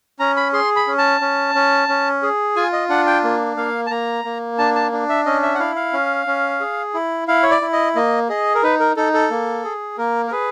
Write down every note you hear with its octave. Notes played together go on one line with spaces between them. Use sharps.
C#4 A#5
B5
G#4 C6
B5
C#4
A5
C#4
C#4
C#4
G#4
F4 G#5
D#5
D4 F#5
G5
A#3
A#3 F5
A5
A#3 A#5
A#3
D4 A5
A5
D4
E5
C#4 D#5
E5
F#5
E4 F5
F5
C#4
C#4
G#4
E4
E4 F5
C#5
D5
E4
D#5
A#3 D#5
G#4 D#5
A#4
D#4 B4
A#4
D#4 A4
A4
A#3
G#4
A#3 A#4
A#4
G#4 B4